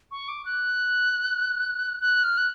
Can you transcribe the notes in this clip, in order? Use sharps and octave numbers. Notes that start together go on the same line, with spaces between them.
C#6
D6
F#6
F#6
F6
F#6